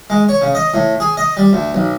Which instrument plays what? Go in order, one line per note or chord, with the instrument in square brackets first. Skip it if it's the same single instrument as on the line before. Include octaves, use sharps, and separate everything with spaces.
[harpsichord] G#3
C#5
C#3
D#5
A2
G#4
D#5
G3
D2
B1